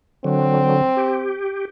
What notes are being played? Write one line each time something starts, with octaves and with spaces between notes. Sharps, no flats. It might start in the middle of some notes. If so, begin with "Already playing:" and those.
D3 F#3 C4
G4